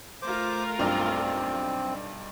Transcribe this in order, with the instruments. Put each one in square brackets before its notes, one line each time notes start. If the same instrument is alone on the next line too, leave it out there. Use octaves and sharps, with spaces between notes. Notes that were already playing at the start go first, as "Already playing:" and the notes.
[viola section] A3 F4 A#4 [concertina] C5 D6
[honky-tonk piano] B1 G2 D5 [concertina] C4